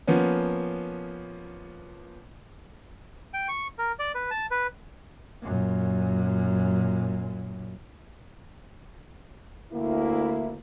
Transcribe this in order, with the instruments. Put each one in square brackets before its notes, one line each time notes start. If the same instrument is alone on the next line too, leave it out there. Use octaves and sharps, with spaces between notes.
[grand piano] F3 A#3 B3 C#4
[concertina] G5
C#6
A#4
D5
B4
A5
B4
[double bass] F#2 A#2
[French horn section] D2 A#3 E4